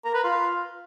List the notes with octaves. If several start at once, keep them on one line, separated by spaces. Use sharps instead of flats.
A#4
B4
F4